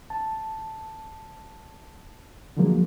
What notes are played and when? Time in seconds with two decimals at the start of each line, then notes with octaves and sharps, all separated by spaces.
0.10 A5
2.57 D3 F3 F#3 G#3 A#3